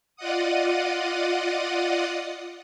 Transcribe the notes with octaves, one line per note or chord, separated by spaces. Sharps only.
F4 D5 D#5 F#5 D#6